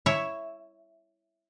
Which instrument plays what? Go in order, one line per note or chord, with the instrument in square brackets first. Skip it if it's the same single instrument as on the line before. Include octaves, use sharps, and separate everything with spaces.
[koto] E4 C#5 E5